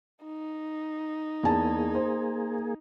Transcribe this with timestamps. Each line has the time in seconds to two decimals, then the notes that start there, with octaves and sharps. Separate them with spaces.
0.25 D#4
1.43 E2 A#3 G#4 A5
1.95 C5